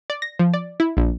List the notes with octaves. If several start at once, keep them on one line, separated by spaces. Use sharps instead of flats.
D5
A#6
F3
D5
E4
A#1